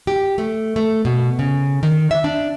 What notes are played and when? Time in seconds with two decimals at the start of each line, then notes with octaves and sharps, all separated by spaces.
0.07 G4
0.38 A3
0.76 A3
1.05 B2
1.39 C#3
1.83 D#3
2.11 E5
2.24 D4